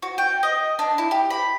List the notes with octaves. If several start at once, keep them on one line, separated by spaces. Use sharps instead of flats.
F#4
G5
D#5
D4
E4
G4
B5